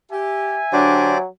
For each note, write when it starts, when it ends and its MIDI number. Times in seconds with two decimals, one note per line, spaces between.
0.12 0.58 67
0.12 1.22 76
0.12 1.22 80
0.73 1.13 50
0.73 1.26 54
0.73 1.13 62
0.73 1.18 67
0.73 1.18 72
0.73 1.18 74